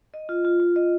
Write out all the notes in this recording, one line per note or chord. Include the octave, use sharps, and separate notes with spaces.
D#5
F4
F4
F4
D#5